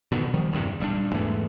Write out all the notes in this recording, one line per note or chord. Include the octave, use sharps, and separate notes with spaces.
B2 D3 D#3 B3
D#3 F3 G3
F#1 E2 G2 C3
D#1 G3 D4
E2 G#2 E3 A3